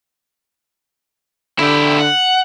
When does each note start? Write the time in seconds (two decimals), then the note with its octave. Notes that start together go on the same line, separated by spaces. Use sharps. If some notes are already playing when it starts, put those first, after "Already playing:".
1.59 D3 E4 G4
2.00 F#5